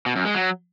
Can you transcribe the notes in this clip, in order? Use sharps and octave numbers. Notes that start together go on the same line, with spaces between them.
B2
F#2
G#3
F#3